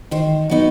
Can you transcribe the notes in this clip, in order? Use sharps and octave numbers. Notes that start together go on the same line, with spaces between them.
D#3 C5
F#3 B3 D#4